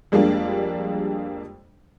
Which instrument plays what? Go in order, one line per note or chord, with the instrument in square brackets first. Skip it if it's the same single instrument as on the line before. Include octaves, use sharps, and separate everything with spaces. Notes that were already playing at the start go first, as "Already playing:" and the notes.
[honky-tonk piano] F2 G3 G#3 A#3 D4